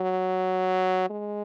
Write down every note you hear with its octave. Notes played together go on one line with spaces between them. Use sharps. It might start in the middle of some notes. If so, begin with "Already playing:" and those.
Already playing: F#3
G#3